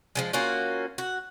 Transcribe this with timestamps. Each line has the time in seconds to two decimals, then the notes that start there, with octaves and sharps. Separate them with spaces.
0.15 F3 G3 G#3
0.33 A#3 C#4 F4 F#4
0.98 F#4